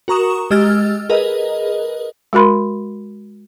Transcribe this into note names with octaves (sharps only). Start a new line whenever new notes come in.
F#4 A#4 A#5 C#6 D#6 E7
G#3 G4 D#5 E6 F6 A6
G#4 A#4 B4 D#5
G#3 F#4 A#4 B5 C6